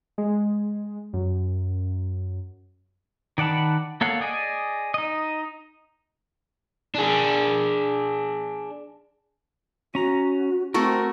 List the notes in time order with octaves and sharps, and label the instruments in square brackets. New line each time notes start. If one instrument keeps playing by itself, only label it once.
[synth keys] G#3
F#2
[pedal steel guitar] D#3 D5 F#5 A5 B5
A#3 A4 C#5 F5 F#5
G#4 D5 D#5 G#5
D#4 D#5
[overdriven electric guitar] D4 G#4
[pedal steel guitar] C#4 A#5 [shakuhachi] F#4
[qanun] A3 F#4 A4 [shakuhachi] C4 [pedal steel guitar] A#4